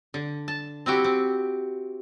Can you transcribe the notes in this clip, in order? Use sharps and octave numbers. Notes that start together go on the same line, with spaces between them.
D3
A5
C4 E4 F#4 G4
C4